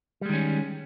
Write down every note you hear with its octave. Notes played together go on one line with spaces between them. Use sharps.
D#3 G3 G#3 C#4